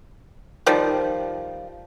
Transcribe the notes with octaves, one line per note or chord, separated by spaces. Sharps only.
D#3 F3 G3